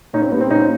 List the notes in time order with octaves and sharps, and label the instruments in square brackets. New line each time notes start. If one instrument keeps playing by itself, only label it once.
[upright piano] A#2 C#4 D#4
C4
G3 B3
C4
A#2 C#4 D#4